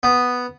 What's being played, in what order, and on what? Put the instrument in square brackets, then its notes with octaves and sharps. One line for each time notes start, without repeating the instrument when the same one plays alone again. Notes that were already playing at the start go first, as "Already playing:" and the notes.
[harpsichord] B3